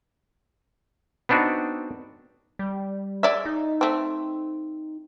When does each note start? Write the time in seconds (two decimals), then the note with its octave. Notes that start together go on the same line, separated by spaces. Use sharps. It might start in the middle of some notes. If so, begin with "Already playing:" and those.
1.29 B3 C4 D4 D#4 F#4
2.59 G3
3.23 G#3 D5 E5
3.45 D#4
3.81 A3 C4